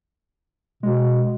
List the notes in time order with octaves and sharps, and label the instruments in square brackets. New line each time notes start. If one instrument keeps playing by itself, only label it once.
[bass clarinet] B2 [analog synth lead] G#3